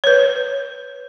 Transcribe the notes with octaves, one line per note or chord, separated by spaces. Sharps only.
B4 C#5